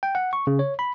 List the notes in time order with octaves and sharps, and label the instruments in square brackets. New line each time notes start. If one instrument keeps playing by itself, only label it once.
[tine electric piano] G5
F#5
C#6
C#3
C#5
B5